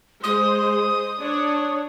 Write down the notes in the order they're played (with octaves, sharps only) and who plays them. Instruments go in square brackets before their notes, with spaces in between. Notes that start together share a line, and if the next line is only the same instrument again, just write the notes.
[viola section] G#3 C5 [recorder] D#6
[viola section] D4 C#5